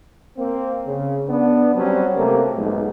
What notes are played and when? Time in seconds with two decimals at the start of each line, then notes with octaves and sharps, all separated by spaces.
0.37 A#3 C4
0.86 C#3
1.27 B3 D4
1.74 F#3 G3 C4 C#4
2.16 C3 A3 A#3
2.55 B1 F2 G#2